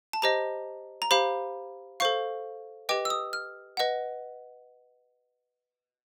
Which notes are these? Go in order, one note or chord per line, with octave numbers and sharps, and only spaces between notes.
A5
G4 C5 D#5 A#5
A#5
G4 C5 F5 B5
A4 C5 F5 C#6
G4 B4 D#5 G5 D6
E6
D#6
F6
B4 D#5 F#5